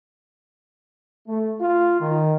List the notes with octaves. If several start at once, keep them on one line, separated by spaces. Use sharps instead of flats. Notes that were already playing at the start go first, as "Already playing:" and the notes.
A3
F4
D#3